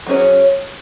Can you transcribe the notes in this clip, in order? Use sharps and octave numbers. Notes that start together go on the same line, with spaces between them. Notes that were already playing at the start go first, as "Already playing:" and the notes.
F#3 C#4 G#4 C#5